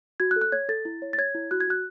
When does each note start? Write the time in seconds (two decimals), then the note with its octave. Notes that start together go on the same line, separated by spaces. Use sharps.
0.20 F#4 G#6
0.31 F#6
0.36 A4
0.41 F#6
0.52 C#5 G#6
0.69 A4 A6
0.85 E4
1.02 C#5
1.13 A6
1.18 C#5 G#6
1.35 E4
1.51 F#4 F#6
1.60 G#6
1.68 F#4 F#6